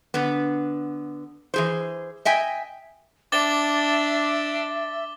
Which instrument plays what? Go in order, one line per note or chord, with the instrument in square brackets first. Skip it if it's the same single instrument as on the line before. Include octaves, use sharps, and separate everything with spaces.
[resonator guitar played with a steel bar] D3 B3
E3 G#4 C5
D#5 E5 G5 G#5
[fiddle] D4 [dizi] E5 [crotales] D6 A6 G7